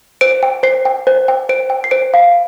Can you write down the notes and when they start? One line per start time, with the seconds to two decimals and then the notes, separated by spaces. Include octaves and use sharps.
0.21 C5 D7
0.43 G5
0.63 C5 C7
0.85 G5
1.07 C5
1.28 G5
1.49 C5 D7
1.70 G5
1.84 C7
1.91 C5 D7
2.14 F5